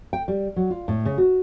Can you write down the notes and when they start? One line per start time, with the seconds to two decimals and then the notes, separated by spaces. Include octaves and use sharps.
0.13 G5
0.28 G3
0.56 F#3
0.70 F4
0.88 A2
1.05 C#3
1.18 F#4